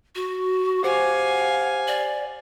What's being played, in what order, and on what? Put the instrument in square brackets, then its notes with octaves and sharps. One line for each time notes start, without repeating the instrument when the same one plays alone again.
[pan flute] F#4
[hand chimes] G4 C5 D6 [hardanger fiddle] F5 G#5 [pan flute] F#5
[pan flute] D5